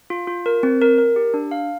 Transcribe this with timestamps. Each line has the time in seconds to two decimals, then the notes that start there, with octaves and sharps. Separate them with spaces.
0.10 F4
0.28 F4
0.46 A#4
0.63 C4
0.82 A#4
0.98 A#4
1.16 G4
1.34 D4
1.51 F5